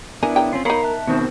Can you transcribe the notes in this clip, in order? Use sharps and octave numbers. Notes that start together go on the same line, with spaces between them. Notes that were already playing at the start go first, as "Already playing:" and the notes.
B3 D4 E4 A#4 G#5
C#3 A#4 G5
C4 C#4 F4
B3 D#4 A#4 C#5 F5 B5
E5 A5 F#6
B2 D#3 C4